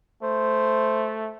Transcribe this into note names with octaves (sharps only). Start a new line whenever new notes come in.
A3 C5